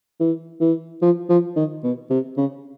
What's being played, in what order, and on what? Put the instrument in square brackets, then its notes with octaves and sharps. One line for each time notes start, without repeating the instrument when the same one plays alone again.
[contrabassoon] E3
E3
F3
F3
D#3
B2
C3
C#3